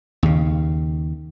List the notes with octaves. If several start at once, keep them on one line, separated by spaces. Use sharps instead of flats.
D#2 C#3